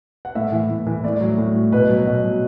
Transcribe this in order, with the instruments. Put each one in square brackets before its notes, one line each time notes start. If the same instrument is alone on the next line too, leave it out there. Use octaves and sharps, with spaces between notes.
[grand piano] F#5
A2 E5
E3
A2
E3
A2 D5
F#3
A2
F#3
B2 B4
F#3
B2
F#3